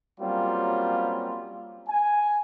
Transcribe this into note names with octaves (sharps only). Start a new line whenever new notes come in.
F#3 G3 A#3 C4 C#4 F4
G#5